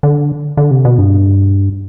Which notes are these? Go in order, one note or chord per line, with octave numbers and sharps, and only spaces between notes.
D3
D3
C3
B2
G2